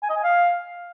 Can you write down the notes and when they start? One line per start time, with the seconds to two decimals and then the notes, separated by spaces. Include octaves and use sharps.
0.03 G#5
0.10 D#5
0.17 G#5
0.23 F5